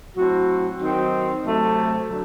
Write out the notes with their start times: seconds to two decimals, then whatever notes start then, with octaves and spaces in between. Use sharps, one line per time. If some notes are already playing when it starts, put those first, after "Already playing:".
0.16 A2 F#3 C4 F#4
0.80 D#3 F#3 C4 D#4
1.45 C3 F#3 A3
2.09 D3 F#3